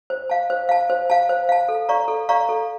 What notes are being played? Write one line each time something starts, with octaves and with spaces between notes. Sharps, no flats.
C5
F5 A5
C5
F5 A5
C5
F5 A5
C5
F5 A5
A4
D5 F5 A#5 C#6
A4
D5 F5 A#5 C#6
A4